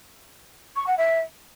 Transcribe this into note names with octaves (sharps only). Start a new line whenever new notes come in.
C#6
F#5
E5